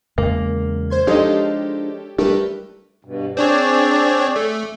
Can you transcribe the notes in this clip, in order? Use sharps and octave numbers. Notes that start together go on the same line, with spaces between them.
E2 C#3 G#3 A#3
C5 C6 G#6
F3 G#3 D4 D#4 G4 A4 C#5
G3 A3 D4 G4 A#4 B4
G2 B2
C4 D4 G#4 C#5 D5
A3